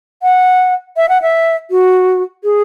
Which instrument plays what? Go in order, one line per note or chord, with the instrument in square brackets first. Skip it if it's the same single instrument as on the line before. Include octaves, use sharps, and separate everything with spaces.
[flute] F#5
E5
F#5
E5
F#4
G#4